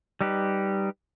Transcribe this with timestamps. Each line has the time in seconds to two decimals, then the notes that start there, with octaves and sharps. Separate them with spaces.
0.21 G3 D#4 G4 B4